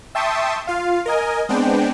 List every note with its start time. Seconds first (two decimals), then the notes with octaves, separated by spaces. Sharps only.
0.15 E5 G5 A5 C6 C#6 D#6
0.67 F4 F5
1.06 A#4 D#5 G#5
1.49 G#3 B3 C4 D4 G5